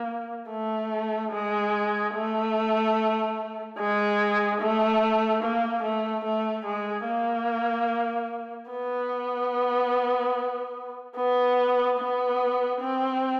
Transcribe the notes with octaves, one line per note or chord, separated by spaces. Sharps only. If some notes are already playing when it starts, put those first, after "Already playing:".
Already playing: A#3
A3
G#3
A3
G#3
A3
A#3
A3
A3
G#3
A#3
B3
B3
B3
C4